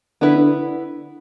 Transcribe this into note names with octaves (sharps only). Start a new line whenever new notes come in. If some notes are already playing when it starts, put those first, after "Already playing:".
D3 B3 E4 B4
D3